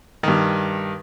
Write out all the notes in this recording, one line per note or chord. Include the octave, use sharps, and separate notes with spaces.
G2 D#3